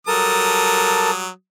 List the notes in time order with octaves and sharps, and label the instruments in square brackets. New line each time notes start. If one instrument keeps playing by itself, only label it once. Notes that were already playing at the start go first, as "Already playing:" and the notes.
[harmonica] F#3 G3 D#6 [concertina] A4 A#4 A5